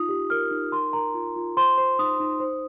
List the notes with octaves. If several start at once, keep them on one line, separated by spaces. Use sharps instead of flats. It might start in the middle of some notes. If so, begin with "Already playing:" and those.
Already playing: D#4 F4 D#6
G4
A#4 F6
D#4
A#4 C6
A#4 A#5
F4
F4
C5 C6
C5
D#4 D#6
D#4
C5